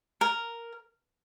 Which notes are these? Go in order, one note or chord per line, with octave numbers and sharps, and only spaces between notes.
A#4